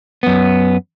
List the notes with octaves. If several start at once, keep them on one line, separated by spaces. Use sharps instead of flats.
F#2 B3